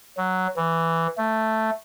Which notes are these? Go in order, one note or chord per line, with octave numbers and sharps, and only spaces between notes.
F#3
E3
A3